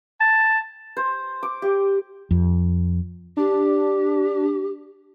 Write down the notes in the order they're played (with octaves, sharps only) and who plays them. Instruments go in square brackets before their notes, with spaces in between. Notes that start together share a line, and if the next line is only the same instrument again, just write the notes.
[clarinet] A5
[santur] C5
D6
G4
[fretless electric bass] F2
[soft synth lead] D4 [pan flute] G4